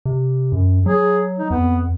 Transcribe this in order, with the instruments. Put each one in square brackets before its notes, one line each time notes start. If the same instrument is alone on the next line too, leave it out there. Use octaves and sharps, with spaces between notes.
[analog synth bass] C3
F#2
[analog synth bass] F#3 [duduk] G#4
[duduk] D#4
[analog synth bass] F2 [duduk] B3